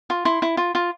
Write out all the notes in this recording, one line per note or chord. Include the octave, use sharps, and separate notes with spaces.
F4
E4 C6
E4
F4
F4